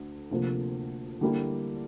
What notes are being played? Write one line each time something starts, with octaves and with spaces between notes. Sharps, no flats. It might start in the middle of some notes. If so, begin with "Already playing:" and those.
Already playing: D2
D2 C3 F3 A#3
D3 G3 A#3 E4